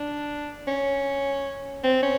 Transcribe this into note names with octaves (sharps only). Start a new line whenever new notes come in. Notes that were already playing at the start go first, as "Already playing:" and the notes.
Already playing: D4
C#4
C4
C#4